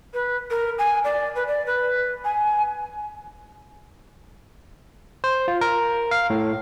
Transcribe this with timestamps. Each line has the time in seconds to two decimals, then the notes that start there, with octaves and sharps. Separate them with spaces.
0.14 B4
0.50 A#4
0.78 G#5
1.04 D5
1.35 B4
1.47 D5
1.66 B4
2.25 G#5
5.24 C5
5.48 F4
5.61 A#4
6.11 F5
6.30 A2